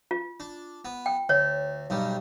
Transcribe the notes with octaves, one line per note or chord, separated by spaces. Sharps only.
F4
D4
B3
G5
D2 C#5
B1 G2 G3